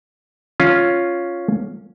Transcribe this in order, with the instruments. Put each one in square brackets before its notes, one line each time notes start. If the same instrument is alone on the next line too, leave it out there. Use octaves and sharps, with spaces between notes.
[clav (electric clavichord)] C#4 F4